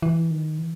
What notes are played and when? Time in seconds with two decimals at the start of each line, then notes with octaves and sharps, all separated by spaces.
0.02 E3
0.31 D#3
0.59 E3